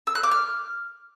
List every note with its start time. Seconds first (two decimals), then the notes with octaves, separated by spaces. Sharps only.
0.07 E6
0.15 F#6
0.23 D6
0.31 F6